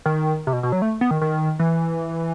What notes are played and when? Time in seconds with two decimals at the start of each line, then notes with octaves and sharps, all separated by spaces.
0.06 D#3
0.47 C3
0.53 B2
0.63 B2
0.72 F#3
0.82 A3
1.01 B3
1.11 D#3
1.22 D#3
1.59 E3